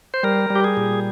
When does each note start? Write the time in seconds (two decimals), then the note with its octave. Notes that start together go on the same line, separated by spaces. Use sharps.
0.14 C5
0.23 G3 A#4
0.50 G3
0.56 G4
0.64 G#4
0.77 A#2